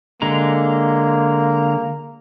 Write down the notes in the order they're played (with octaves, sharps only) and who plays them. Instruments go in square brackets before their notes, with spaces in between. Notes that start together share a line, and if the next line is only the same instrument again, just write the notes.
[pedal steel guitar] D3 G#3 A#5 [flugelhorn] A#3